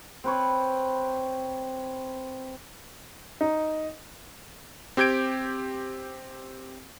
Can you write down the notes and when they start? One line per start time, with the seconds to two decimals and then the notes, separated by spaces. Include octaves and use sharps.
0.24 C4 B4 C#5
3.41 D#4
4.97 C4 G4 G6 G#6 D7